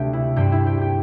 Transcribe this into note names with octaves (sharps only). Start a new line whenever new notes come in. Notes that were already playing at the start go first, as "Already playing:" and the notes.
Already playing: D2 C3 A3 C4 G4
E4
G2 G3 C4 G4
E4
G4
G4